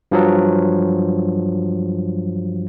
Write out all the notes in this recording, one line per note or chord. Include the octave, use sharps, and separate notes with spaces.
G2 F3 F#3